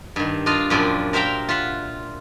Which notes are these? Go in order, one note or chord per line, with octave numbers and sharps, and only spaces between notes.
G2 D#3
D4 F4 D#5 F5
F#2 A#2 F3 G3 D4
A#4 C5 E5 F5 G5 A#5
F4 E5 F#5